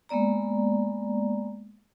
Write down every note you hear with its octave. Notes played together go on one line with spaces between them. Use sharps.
G#3 A#3 B3 D5 A#5